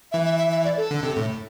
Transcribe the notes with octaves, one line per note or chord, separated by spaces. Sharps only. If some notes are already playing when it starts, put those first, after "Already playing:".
E3 E5
E5
E5
E5
D5
A4
D3
C3
A2